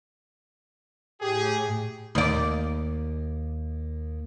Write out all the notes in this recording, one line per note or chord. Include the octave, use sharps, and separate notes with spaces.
A2 G4 G#4
D#2 D5